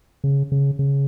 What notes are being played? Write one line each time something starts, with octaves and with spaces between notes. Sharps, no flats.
C#3
C#3
C#3